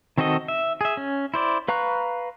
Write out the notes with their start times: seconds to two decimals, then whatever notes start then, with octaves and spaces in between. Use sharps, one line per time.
0.18 D#3 C4 F#4 A4 D#5
0.48 E5
0.81 G#4 E5
0.97 C#4
1.34 E4 C5 D5
1.68 B4 F5 A#5 C#6 F#6